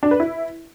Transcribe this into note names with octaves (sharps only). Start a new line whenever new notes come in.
D4
B4
E4